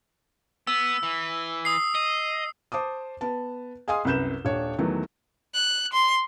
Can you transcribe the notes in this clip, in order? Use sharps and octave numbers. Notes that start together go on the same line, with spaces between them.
B3 E6
E3
D#6 C7
D#5
C5 A5 D6 D#6
B3 A5
G#4 D#5 F5 G#5 C6 D#6
C2 F#2 B4 G6 E7
D#1 D4 C#5
E2 D#3 E3 F#3 A3
F#6
C6